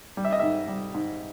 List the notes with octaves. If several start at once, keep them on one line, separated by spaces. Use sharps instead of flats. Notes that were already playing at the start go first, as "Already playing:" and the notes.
G3
E5
D#5
G#2 E5
G3
G#2